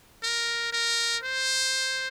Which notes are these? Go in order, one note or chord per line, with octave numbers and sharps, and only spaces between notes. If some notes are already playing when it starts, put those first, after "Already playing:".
A#4
A#4
C5